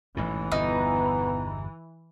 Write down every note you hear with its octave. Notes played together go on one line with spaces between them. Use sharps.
A1 G#2 B2 E3
G1 E2 B2 B3 D#4